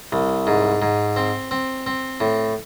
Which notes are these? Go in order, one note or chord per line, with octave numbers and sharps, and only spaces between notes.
C2
G#2
G#2
C4
C4
C4
A2